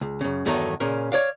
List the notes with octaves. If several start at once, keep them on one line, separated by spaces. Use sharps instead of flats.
C#2
F#2 C#3
E2 G2 D#3 F#3 A3 D#4
A#2 C#3 C#4 A#4
C#5 D5 F5